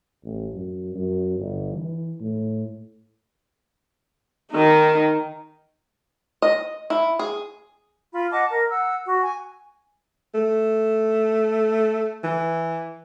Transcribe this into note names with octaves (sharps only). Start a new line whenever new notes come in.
A1
F#2
F#2
G1
E3
A2
D#3 D#4
D#5
E4
G#4
F4 B5
D#5 F#5 A5 D6
A#4
F#5 E6
F#4
G#5
A3
E3